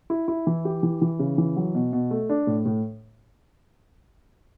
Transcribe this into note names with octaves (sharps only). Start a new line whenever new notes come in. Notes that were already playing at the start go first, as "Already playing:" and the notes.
E4
E4
E3
G4
E3
E3
C#3
E3
F#3
B2
B2
A3
D4
A2
A2